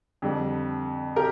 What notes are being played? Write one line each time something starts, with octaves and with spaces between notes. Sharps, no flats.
F2 D3 G3
G4 A#4